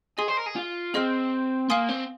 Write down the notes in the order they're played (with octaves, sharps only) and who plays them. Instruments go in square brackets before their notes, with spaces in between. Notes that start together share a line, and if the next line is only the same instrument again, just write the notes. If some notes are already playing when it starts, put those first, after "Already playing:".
[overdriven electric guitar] G#4 [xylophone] D#5 C6 D#6
[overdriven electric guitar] C5
A#4
G#4
F4
[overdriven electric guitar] C4 [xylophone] G#4 D#5 C6 F6
[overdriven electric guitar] A#3 [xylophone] F5 G#5 C6 D#6
[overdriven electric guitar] C4